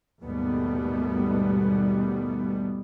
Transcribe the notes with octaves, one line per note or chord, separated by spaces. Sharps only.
D#2 G#2 B2 G3 A3 B3